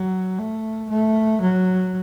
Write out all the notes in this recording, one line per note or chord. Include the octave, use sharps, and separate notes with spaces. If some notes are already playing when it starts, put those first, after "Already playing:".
Already playing: F#3
A3
A3
F#3